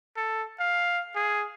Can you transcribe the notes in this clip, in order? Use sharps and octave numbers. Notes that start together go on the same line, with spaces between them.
A4
F5
G#4